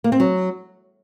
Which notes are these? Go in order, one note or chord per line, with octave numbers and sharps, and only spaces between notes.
A#3
C4
F#3